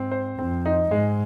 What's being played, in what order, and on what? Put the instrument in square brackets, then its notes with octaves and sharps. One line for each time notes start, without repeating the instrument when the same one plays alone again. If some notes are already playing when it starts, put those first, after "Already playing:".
Already playing: [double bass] G#2 [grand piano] C4
[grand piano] C5
[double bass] F2 [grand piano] C4
[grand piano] D#4
[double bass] G#2 [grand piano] G#3